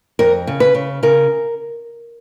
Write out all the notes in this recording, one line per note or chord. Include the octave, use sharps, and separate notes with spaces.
F2 A#4
C#3
B4
C#3
C#3 A#4